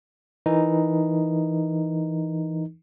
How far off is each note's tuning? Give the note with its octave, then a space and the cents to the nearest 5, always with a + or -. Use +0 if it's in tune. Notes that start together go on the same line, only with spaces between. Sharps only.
E3 +0 D#4 +0 A#4 +0